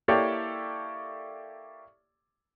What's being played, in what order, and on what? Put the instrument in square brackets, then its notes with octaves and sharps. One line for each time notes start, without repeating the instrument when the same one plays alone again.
[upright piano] A#3 E4 G4 A4 C#5 D5